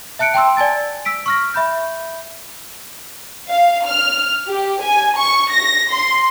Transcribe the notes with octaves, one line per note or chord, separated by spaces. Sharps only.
E5 A5 F#6 C#7 D7
G5 A5 C6 E6
D5 G#5 A5 A6
E6 B6 D7
C#6 F6 A#6
E5 B5 G6
F5
F6
G4
G#5
C#6
A#6
C6